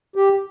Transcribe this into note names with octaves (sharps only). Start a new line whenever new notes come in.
G4